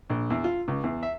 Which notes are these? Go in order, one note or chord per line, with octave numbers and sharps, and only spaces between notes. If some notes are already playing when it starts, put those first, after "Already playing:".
A#1
E2
F4
C#2
E2
E5